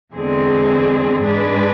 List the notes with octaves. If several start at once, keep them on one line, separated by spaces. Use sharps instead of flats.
E2 D3 G#3 C4 G#4
G#2 G#3 D4 G#4 B4